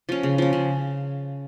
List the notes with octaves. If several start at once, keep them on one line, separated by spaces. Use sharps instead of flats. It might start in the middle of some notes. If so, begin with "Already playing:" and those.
F3 C#4
C#3
F3 C#4
C#3